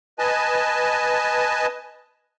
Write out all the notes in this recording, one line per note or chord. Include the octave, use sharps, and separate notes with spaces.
B4 D#5 G#5 A5